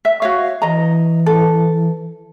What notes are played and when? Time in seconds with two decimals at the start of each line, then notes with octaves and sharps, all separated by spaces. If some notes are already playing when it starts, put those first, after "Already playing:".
0.05 E5
0.22 F#4 C#5 F5
0.62 E3 D#5 A#5
1.26 A4